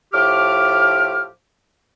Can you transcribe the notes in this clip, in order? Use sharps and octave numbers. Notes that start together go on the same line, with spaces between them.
A2 F3 G4 D6 F6